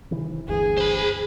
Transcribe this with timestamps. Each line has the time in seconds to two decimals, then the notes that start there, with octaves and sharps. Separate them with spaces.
0.11 C3 D#3 E3
0.48 G1 D2 E3 G#4
0.77 C5 B5